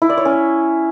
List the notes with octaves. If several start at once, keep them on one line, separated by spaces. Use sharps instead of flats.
E4
D5
C#5
C#4